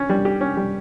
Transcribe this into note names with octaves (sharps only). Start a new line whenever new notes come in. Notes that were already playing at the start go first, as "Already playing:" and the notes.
Already playing: C#4
G3
G4
C#4
G3